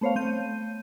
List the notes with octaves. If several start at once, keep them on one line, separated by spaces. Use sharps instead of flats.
A3 B3 C5 C#5 F5
A3 C4 G6 D#7